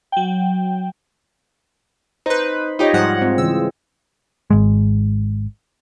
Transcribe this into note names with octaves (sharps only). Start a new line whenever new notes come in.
F#3 G5
D#4 B4 C5
D#4 F4 G4 C#5 D#5
G#2 F3 G3 G#3 C5 F#5
G#2 G#3 C4 F4
C#3 E3 E6
G#1 G#3